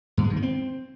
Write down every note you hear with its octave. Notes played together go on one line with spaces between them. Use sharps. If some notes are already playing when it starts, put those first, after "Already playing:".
G2
G#3
D#3
A#3
C4